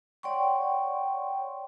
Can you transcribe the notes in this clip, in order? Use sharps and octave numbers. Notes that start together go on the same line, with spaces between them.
C#5 D5 F#5 G5 C6 C#6